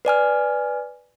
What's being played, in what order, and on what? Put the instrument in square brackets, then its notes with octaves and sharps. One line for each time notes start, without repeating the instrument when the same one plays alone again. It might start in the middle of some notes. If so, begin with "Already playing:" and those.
[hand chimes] B4 D5 G#5 F6